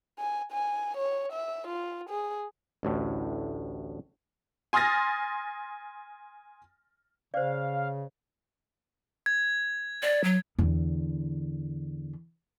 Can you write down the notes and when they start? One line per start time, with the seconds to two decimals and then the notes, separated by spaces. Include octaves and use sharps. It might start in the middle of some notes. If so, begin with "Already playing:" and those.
0.19 G#5
0.52 G#5
0.97 C#5
1.32 E5
1.67 F4
2.10 G#4
2.83 A1 D2 A2
4.73 G#5 C6 D#6 F6 A6 A#6
7.34 C#3 C5 D5 F5
9.26 G#6
10.03 D5
10.24 F#3
10.59 E2 D3